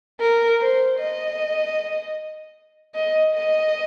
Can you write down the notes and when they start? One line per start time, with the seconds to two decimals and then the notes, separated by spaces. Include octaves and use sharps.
0.21 A#4
0.61 C5
1.00 D#5
2.95 D#5
3.35 D#5